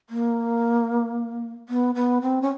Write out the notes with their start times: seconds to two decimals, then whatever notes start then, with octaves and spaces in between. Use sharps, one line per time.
0.10 A#3
1.69 B3
1.95 B3
2.22 C4
2.42 C#4